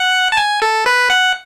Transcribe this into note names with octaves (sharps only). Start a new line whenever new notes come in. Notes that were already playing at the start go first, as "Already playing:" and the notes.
Already playing: F#5
A5
G#5
A4
B4
F#5